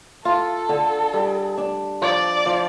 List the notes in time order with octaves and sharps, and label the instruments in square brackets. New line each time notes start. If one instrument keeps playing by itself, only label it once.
[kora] F4 [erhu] A4
[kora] D3
G3
D4
[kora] F3 [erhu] D5
[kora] F3